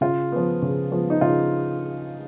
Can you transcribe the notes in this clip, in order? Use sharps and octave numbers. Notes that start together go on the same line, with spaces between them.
C#3 F4
F3 B3
C#3
F3 B3
D#4
C#3 F4